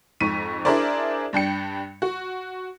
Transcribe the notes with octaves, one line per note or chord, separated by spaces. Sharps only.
F2 G#2 C#6 B6 D#7
D4 E4 G#4 A#4 C5 D5
G2 D4 G5 C#7
F#4